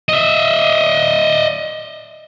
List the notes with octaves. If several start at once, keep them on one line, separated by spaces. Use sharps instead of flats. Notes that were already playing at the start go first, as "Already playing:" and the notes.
D#5 E5